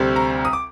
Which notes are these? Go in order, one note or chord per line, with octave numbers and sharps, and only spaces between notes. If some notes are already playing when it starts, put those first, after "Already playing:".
Already playing: D2 C3 G3 C4
A#5
D#6
D6